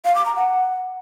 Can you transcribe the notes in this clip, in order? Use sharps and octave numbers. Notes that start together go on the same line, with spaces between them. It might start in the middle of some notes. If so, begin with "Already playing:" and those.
F5
D6
A#5
F#5